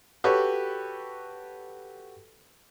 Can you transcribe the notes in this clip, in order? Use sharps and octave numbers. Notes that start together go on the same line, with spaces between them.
F#4 G4 A4 B4 C#5